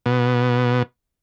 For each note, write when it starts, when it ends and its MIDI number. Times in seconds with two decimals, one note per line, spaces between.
0.06 0.83 47